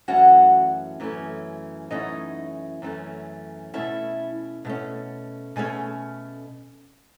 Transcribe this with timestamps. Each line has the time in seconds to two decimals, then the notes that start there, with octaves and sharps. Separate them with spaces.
0.08 F#2 E3 A3 C#4 F#4 F#5
1.00 F#2 E3 A3 C#4
1.91 F#2 E3 A3 C#4 D#4 D#5
2.82 F#2 E3 A3 C#4
3.74 B2 A3 C#4 E4 E5
4.65 B2 A3 C#4
5.56 B2 A3 C#4 G#4 G#5